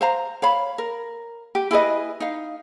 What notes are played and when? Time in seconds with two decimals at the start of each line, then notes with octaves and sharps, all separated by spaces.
0.01 C5 F5 A#5
0.42 C#5 F5 B5
0.78 A#4
1.55 G4
1.71 E4 G#4 B4 D#5
2.20 D#4 F5